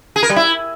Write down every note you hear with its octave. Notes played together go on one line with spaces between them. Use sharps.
G#4
A#4
G3
E4